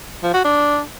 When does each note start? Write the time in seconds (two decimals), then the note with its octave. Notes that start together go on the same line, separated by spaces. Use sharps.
0.23 F3
0.34 F#4
0.45 D4